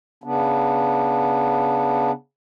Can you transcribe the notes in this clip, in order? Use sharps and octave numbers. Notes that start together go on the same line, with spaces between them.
C#3 B3 D4